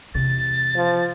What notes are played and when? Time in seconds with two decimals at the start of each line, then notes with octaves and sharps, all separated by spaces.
0.14 E2 C3 A6
0.75 F3